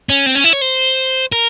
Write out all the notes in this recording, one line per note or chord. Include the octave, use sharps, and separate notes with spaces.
C#4
C4
C#4
E4
C#5
C5
A#4